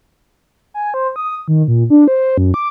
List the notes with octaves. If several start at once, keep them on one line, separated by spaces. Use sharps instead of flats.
G#5
C5
D#6
D#3
A#2
D4
C5
F#2
D6